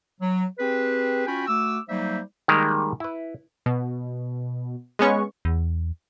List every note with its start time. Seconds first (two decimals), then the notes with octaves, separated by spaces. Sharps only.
0.21 F#3
0.59 C4 G4 G#4 B4
1.27 C#4 F4 F#4 G5 G#5 B5
1.47 A3 F#4 D6 E6
1.89 F#3 G3 A#3 D#4 C5 E5
2.48 D#3 G3 G#3 A#3 A#4
3.00 E4 B4
3.66 B2
4.99 G#3 B3 C#4 C#6
5.45 E2